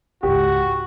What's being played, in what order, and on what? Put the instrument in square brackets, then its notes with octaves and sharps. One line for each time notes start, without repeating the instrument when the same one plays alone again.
[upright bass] C#2 G#2 [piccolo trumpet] F#4 [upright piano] G4